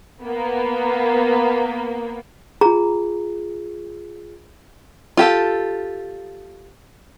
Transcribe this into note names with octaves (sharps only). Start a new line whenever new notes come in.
A#3 B3
F4 G#4 A#5
F4 G4 A4